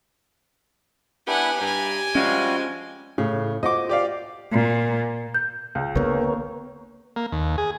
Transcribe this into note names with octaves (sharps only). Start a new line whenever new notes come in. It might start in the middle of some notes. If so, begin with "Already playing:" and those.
B3 D4 E4 G4 F#5 G#5
G2 G4 G#5 A#5 B5
F3 G3 G#3 C#4 F4 F#4
A2 C#3
F4 F#4 C5 D#5 D6
G4 D5 F5
A#2
G6
C#2
D3 A#3 B3 A#4 C#5
A#3
D#2
G#4